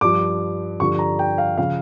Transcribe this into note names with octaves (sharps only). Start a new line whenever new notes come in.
G2 F3 D6
G2 D3 F3 C#6
A#5
G5
F5
C#3 F3 F5